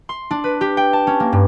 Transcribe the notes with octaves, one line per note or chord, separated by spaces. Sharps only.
C6
D4
B4
G4
G5
A5
C#4
A#3
G2